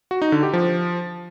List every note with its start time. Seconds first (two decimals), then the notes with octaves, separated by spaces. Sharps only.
0.11 F#4
0.22 D#4
0.32 D3
0.43 G4
0.53 F3